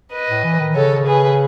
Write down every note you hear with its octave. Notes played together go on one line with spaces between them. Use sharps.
B4 D#5
A2
E3
D#3
C#3 A4 C#5
G#4 B4